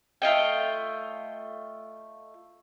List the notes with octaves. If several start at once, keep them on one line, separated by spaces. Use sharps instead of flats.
A3 F4 D#5 G5